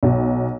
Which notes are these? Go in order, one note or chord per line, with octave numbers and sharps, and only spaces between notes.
B1